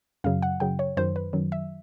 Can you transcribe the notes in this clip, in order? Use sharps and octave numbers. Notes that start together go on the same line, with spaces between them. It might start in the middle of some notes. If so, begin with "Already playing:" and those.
F#2 C#3 F#3 F5
F#5
F#2 C#3 F#3 G5
C#5
F#2 D#3 F#3 C5
B4
F#2 D#3 F#3
E5